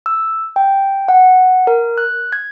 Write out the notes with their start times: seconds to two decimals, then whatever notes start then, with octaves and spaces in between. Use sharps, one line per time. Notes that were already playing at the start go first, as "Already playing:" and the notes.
0.06 E6
0.56 G5
1.08 F#5
1.67 A#4
1.98 F#6
2.32 G#6